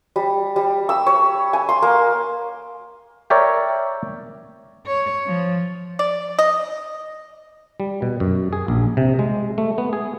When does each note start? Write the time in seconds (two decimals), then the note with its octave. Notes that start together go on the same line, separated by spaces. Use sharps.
0.16 G3
0.56 G3
0.89 E6
1.07 C#5
1.53 G#5
1.69 C6
1.82 A#3
3.30 A#4 C#5 D5 E5 G5
4.86 C#5
5.26 F3
5.99 D5
6.39 D#5
7.80 G3
8.02 B2
8.20 F#2
8.53 G#4
8.68 A#1
8.97 C3
9.19 G#3
9.58 A3
9.78 B3
9.93 G#4